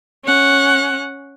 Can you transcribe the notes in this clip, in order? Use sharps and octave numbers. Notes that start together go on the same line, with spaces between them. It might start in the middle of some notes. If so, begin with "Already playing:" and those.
C#4 F#5